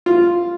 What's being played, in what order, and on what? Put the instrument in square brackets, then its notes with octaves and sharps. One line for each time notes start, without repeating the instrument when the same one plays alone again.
[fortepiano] F4